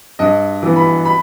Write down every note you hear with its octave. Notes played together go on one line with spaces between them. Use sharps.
G2 D#5
E3 B3
B5
B5